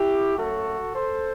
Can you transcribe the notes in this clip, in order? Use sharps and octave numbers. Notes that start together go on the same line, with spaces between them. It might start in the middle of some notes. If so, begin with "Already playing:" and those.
Already playing: E4 G4
F#2 F#3 A3 F#4 A4
A4 C5